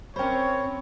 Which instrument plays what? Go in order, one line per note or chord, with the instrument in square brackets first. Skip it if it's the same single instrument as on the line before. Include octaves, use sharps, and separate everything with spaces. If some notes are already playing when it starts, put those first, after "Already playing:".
[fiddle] C4 [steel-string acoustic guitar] C#4 A#4 C5 [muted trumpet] C#5 [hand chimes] G5 B5